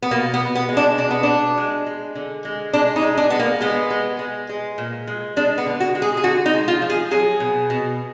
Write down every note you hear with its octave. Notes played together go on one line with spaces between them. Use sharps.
B3
B2 A#3
B3
B2
B3
G#3
D4
B2 D4
B3
B2 D4
G#3
G#3
D3
G#3
G#3 D4
D#4
G#3
D4
G#3 B3
A#3
G#3 B3
G#3
G#3
G#3
A#2
G#3
G#3 D4
B3
D3
F#4
G#3
G#4
G#4
D3 F#4
D#4
G#3
F4
F3
G#4
F#3 G#4
B2
B2